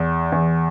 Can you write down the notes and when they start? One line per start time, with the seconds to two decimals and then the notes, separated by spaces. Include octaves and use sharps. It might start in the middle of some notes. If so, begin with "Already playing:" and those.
Already playing: E2
0.32 E2